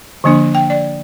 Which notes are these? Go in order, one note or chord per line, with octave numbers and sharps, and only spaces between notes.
D3 F3 A#3 D4
G5
D5